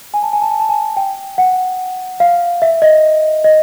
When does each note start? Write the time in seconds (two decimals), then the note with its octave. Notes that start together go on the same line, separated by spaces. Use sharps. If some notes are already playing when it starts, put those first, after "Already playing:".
0.14 G#5
0.23 A5
0.33 G#5
0.42 A5
0.50 G#5
0.60 A5
0.69 G#5
0.97 G5
1.38 F#5
2.20 F5
2.62 E5
2.82 D#5
3.44 D#5